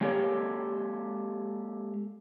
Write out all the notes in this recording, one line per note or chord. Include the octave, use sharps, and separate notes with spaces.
G#3 A#3 G4 A4 C#5 D5